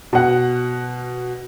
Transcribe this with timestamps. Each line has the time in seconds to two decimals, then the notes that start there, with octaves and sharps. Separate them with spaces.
0.13 B2 F#5